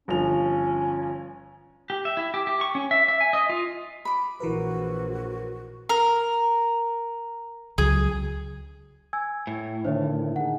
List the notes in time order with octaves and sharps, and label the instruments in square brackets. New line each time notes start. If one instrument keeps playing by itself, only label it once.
[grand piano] G1 F3 F7 [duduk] C#4
[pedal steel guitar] G4
E5
E4
G4
G4
C#6
C#4
E5
E5
G#5
D#5
F4
[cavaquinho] B5 D6
[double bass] A#1 [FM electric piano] E3 A#4 B4 [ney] F#4
[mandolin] A#4
[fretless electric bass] C#2 F#3 [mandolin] G#4
[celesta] G#5 E6 G#6
[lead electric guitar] A2
[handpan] D3 D#3 D4 [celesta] C5 C#5 E5
[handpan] D#4 G#4 [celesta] F#5